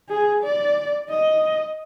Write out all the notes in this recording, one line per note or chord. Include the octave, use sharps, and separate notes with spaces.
G#4
D5
D#5